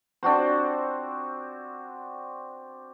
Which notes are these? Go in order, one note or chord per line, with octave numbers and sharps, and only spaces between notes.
C4 D4 F#4 C5